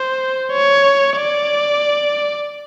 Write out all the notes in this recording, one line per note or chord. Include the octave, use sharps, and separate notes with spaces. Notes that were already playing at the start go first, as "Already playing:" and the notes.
Already playing: C5
C#5
D5